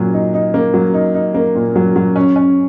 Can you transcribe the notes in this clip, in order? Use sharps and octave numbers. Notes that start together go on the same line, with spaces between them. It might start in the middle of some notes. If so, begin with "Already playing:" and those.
Already playing: A#2 F#3
D#4
D#4
A#3
F#3
D#4
D#4
A#3
A#2
F#3
F#3
C#4
C#4